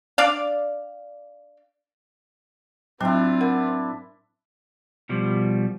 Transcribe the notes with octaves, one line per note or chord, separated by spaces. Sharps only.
D4 D5 F5
A2 F#3 C4 D4 E4 F4 G5
A#4 F#5
B2 F3 G3